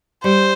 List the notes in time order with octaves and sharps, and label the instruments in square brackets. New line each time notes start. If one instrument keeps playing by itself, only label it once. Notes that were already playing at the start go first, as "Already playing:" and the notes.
[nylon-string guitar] G3 [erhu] C5